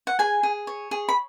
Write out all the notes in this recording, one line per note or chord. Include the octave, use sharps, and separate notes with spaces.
F#5
G#4 G#5
G#4
C#5
G#4
B5